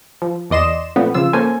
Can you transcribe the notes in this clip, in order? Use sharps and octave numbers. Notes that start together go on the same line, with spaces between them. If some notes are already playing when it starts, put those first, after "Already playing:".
F3
E2 D5 D#5 C6 E7
A#2 F3 A3 B3 C4
C#3 F3 F4 E6
A#3 C#4 A4 C5 G#5